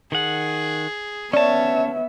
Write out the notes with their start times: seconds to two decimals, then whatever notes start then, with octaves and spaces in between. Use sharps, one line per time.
0.12 D#3 G#4 F#5
1.33 B3 C#4 C#5 D5 E5 A5